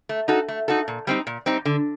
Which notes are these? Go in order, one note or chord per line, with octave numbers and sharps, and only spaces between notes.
A3
D#4 F#4 A4
A3
D#4 F#4 A4
A#2
G3 C4 D#4
A#2
G3 C4 D#4
D3